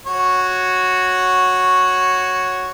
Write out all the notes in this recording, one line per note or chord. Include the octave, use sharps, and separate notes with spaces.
F#4 C#5